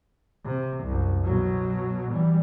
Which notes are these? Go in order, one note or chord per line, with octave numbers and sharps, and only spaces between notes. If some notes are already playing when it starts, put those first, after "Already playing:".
C3
C2 F#2
B2 F#3
E3 G3